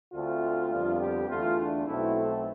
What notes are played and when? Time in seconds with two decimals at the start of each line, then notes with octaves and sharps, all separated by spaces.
0.12 D2 D3 A3 C4 F4
0.70 F2 D3 G3 B3
0.99 G4
1.28 E2 D3 A3 F4
1.57 D4
1.86 B1 B2 A3 C4 E4
2.15 A4